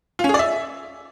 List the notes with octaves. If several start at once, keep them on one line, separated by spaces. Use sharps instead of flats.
F4
C#4
G#4
D5
E5